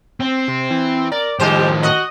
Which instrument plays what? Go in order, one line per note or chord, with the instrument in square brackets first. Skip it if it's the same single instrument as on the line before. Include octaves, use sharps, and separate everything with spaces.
[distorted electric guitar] C4
[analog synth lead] C3
E3
[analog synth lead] A#4 [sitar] D5
[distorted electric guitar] A2 F3 [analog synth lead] D#3 [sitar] G3 C5 [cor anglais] G4
[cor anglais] F#4 [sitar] D#5